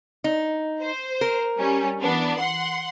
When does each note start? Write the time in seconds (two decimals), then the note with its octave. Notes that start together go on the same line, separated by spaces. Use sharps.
0.24 D#4
0.82 C5
1.21 A#4
1.58 G3 C#4
2.01 E3 B3 D4
2.40 F#5 C6